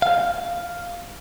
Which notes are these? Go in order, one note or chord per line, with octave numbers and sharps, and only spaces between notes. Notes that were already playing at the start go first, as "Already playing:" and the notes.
F5